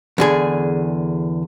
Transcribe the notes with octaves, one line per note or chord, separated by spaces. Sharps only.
E2 D3 G#4